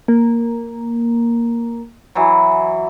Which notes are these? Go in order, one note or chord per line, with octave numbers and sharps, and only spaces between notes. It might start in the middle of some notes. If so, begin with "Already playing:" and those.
A#3
E3 F#3